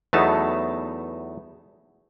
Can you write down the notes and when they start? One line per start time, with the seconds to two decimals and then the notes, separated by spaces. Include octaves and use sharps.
0.13 E2 F#3 A3 B3 D#4 A5